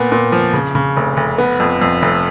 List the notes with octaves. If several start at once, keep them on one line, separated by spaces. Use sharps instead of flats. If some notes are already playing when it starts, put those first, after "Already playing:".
Already playing: A#2 B3
A#2
F3
C#3
C#3
F1
F1
B3
F2
F2
F1